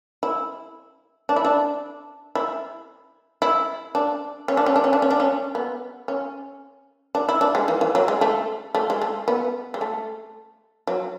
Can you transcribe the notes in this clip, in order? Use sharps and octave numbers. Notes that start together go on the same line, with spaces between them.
E4
D4
E4
D4
E4
E4
D4
C#4
D4
C#4
D4
C#4
D4
C#4
D4
C#4
B3
C#4
D4
E4
D4
G#3
E3
E3
F#3
G#3
A3
A3
G#3
A3
B3
G#3
A3
F#3